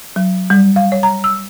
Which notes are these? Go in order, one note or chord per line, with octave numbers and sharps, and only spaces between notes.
F#3
G3
F5
C#5
A#5
E6